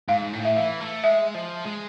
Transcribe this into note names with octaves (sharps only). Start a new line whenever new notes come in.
G#2 F5
A2
E5
E3 F5
A3
G#3 E5
F3
G#3